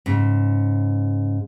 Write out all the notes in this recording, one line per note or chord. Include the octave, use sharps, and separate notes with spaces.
G#2 C#3